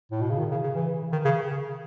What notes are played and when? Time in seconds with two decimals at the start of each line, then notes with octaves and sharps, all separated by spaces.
0.12 A2
0.21 B2
0.30 C#3
0.39 D#3
0.51 C#3
0.64 C#3
0.75 E3
1.12 D#3
1.25 C#3